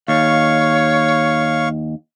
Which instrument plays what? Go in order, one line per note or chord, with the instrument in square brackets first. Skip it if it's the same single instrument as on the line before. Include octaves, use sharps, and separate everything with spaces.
[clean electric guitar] D#2 [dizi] C#5 [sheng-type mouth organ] F5 C#6